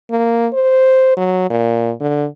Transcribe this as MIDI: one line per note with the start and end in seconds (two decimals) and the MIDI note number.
0.10 0.47 58
0.53 1.14 72
1.17 1.48 54
1.50 1.91 46
2.00 2.26 50